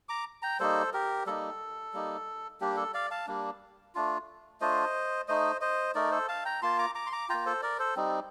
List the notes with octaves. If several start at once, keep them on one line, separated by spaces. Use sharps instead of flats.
A#5 D6
G5 A#5
G3 A#3 D#4 A4 C5
G4 A#4
G3 A#3 D#4 A4
G3 A#3 D#4
G3 A#3 D4 G4
A4
D5 F5
F5 A5
G3 A#3 D4
A3 D4 F4
A3 D4 F4 C5 D#5
A3 D#4 C5 D#5
C5 D#5
A3 D#4 A#4 D5
A4 C5
F5 A5
G5 A#5
A#3 F4 A5 C6
A#5 D6
A#5 D6
C6
A#5 D6
A#3 F4 G5 A#5
A4 C5
A#4 D5
A4 C5
G3 C4 D#4